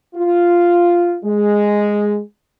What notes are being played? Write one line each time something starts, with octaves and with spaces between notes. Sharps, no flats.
F4
G#3